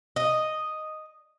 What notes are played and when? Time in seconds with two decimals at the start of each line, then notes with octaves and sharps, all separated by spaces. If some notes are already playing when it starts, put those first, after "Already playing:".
0.16 D#5